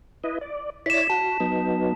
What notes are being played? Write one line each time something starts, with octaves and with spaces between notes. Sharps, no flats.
E4 B4 D#5
D5
E4 C#5 D5 B6 E7
F#4 A5
F#3 B3 D#4